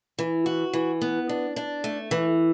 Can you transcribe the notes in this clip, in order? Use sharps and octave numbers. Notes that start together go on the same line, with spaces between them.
E3
F#4
E3
B3
D4
D4
A3
E3